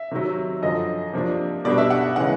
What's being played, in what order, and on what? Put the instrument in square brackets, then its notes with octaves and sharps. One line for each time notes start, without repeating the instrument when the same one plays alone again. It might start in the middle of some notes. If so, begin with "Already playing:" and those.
Already playing: [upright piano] E5
C3 D#3 F#3
F#2 D3 F3 D#5
C3 F3 A#3 D4
B2 G3 B3 D4 D5
E5
F#5
C#3 E3 G#3 B3 F#5